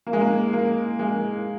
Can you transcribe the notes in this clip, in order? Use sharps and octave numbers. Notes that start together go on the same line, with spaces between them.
A#3
G#3
A#3
A#3
G#3